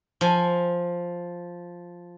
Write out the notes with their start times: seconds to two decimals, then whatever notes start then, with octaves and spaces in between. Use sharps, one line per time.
0.21 F3 G#5